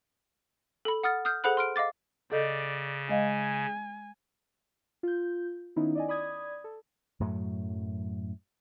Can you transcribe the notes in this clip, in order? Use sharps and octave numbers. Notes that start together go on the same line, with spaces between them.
A4 B5
F#5 D#6 F6 A6
D#6 F6 G6
G#4 A4 C5 F#5 B5 F#6
C6 F6 D7
D#5 F5 D6 A6
C#3 A4 D5 D#5 G6
G#3 D#5 F5 G#5
F4 G6
D#3 B3 C#4 D#4 E4
D5 D#5 G#5
D5 B5 D#6 G#6
A4
F#2 A2 F#3 A3